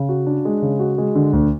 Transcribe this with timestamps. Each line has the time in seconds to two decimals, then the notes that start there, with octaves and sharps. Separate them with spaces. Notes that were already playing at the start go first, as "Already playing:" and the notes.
Already playing: C#3
0.09 F#4
0.26 D4
0.45 G#3
0.62 C#3
0.79 F#4
0.98 G#3
1.15 D3
1.33 D2